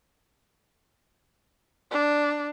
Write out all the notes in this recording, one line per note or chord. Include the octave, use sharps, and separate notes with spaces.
D4